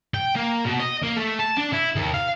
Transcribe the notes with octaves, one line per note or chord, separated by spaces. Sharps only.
G5
A#3
B2
D#5
A#3
A3
A5
D4
E4
D#2
F5